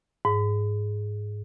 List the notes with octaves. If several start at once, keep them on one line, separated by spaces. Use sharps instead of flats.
G#2